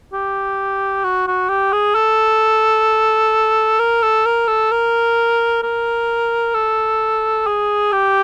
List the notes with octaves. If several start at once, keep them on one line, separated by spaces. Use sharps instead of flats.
G4
F#4
F#4
G4
G#4
A4
A#4
A4
A#4
A4
A#4
A#4
A4
G#4
G4